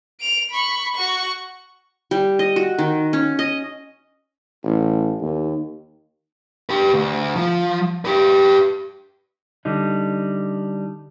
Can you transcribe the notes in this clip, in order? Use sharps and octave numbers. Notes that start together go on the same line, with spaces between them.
D7 F7
B5 C#6
F#4 C#6
G3
D#5
F#4
D#3
C#4
D#5
A1
D#2
G4 B4
D2
F3
G4 B4
D3 G3 D#4